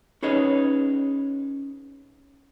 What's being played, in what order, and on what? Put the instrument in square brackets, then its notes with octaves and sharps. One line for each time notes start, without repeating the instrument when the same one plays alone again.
[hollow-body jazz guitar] C#4 D#4 G#4 B4 C#5 D#5